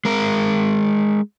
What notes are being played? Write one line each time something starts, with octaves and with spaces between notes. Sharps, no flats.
G#3 A#4